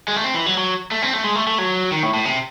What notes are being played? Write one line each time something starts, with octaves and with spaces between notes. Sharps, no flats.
G#3
A3
C4
E3
F#3
F#3
A3
C4
A3
G#3
A3
A3
F#3
D#3
A2
A2
C3